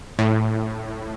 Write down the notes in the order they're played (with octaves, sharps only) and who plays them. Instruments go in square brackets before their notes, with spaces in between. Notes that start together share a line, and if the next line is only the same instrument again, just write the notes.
[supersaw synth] A2